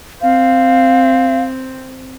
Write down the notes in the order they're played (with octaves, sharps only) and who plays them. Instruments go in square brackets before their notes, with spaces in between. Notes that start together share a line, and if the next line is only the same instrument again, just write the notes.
[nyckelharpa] C4 [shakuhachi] F5